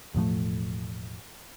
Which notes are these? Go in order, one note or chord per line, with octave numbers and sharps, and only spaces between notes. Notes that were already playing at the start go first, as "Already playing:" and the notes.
E1 A2 F3 A3